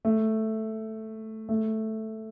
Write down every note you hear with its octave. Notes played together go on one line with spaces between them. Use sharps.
A3
A3